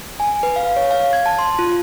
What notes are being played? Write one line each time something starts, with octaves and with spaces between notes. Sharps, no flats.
G#5
B4
F5
C#5
F5
G#6
A5
C6
F4